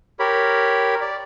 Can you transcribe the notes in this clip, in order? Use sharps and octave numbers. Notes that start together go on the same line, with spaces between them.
G4 A#4 C#5 B5
D5